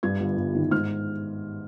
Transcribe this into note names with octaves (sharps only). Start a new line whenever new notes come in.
G2 G#6
G1
G1
D#3
G#2 F6